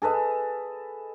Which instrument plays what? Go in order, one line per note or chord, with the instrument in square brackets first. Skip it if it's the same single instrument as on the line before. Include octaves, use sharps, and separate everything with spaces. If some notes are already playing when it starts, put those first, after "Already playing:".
[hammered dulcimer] G#4 A4 B4 D#5